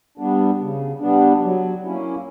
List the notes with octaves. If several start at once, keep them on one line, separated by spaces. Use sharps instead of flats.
G3 B3 D4
C#3
G3 B3 D4
F#3
A#3 C#4 E4